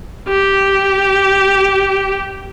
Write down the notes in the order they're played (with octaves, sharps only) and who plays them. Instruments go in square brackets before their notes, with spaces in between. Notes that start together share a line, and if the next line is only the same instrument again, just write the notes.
[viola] G4